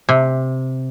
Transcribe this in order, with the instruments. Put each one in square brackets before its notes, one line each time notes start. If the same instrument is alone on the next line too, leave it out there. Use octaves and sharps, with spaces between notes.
[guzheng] C3